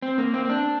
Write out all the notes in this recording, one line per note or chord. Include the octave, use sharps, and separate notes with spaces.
C4
A#3
C4
C4
D4